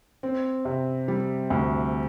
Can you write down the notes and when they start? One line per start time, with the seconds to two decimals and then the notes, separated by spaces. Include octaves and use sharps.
0.23 C4
0.65 C3
1.08 G3
1.50 D2